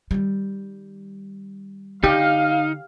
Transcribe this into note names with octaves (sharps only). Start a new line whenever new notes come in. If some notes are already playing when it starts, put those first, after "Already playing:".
D#3 G3
D3 D#4 G4 F5